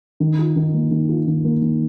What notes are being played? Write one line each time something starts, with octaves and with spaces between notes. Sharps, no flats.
D#3
F4
D#3
A#3
D#3
F4
D#3
A#3
D#3